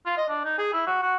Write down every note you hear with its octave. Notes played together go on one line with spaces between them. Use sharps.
F4
D#5
D4
D#4
G#4
E4
F#4
F#4